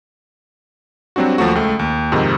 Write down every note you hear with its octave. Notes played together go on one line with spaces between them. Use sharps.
F#3 G3 C4 D4 F#4
D#2 F3 F#3 A3 F#4
C#2 A3
D#2
F2 G#2 C3 D#3